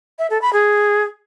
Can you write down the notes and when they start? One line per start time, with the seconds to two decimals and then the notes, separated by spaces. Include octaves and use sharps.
0.19 E5
0.30 A4
0.42 B5
0.53 G#4